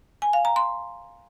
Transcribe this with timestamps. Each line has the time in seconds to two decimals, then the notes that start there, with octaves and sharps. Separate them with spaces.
0.22 G#5
0.33 F5
0.45 A#5
0.56 C6